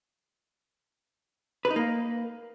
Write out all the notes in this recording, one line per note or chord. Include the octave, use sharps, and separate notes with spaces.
B4
D#4
A#3